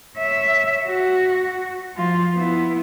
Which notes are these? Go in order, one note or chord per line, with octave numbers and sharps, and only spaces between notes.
C#5 E5
F#4
F3 F4
B3 E4